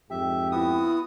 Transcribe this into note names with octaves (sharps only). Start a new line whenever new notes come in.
F2 G#2 G4 E5
B3 E4 F#4 D#6